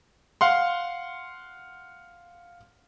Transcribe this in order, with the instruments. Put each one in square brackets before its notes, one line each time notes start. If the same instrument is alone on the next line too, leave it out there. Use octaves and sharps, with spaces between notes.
[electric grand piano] F5 F#5 C6